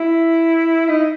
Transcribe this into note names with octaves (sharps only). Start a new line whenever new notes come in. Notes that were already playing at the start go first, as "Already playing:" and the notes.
Already playing: E4
D#4